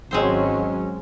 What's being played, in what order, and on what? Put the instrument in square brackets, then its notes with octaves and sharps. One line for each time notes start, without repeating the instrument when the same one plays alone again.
[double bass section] G#1 F#3 C#4 [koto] G#3 C4 C5